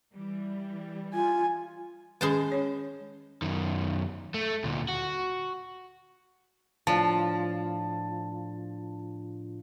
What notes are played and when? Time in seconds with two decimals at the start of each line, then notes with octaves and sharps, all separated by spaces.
0.15 E3 G3
1.14 F4 G#5
2.21 D#3 G#3 C#4 C5 A5
2.52 C#4 C#5
3.42 F#2 D#3
4.34 A3
4.64 D2 A#2
4.88 F#4
6.87 A2 F3 D4 F4 A5